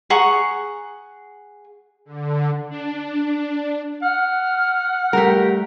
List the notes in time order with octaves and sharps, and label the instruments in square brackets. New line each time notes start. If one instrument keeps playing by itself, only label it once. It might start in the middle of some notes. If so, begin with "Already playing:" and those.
[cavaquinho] G#4 F#5 A#5 C#6
[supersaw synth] D3
[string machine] D4
[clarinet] F#5 [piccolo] F6
[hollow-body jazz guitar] G3 A3 [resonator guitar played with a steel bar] G4 A#4